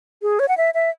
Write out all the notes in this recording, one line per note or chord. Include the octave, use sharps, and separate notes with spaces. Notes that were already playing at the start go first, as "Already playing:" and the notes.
G#4
C#5
F#5
E5
E5